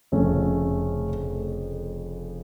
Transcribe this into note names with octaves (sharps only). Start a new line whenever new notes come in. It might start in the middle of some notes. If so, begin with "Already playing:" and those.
F1 F2 C#3 A3 C#4